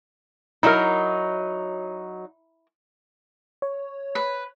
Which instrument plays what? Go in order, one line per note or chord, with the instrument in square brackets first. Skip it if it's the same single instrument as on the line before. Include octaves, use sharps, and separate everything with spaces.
[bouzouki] F#3 D#4 [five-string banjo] E4 A#4
[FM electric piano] C#5
[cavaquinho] B4